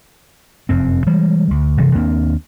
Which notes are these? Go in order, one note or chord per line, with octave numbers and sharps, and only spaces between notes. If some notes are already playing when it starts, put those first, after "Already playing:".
F1 F#2 C4
E3 G3 G#3
D2
F#1 G2 C3 E3
D#2 A#3 C4 D4